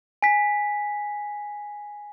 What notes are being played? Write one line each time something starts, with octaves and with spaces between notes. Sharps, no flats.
G#5 B6